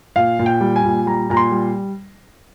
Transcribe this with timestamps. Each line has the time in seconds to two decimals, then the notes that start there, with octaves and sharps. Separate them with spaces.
0.16 A#2 F5
0.39 A#2
0.46 G5
0.61 G3
0.76 G#5
0.85 A#2
1.06 G3 A#5
1.30 A#2 A#5
1.37 C6
1.51 G3